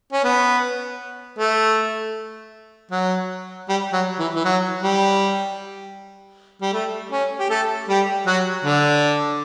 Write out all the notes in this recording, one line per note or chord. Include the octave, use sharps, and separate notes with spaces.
C#4
B3
A3
F#3
G3
F#3
E3
E3
F#3
G3
G3
A3
C#4
G4
A3 A4
G3 G4
F#3 F#4
D3 D4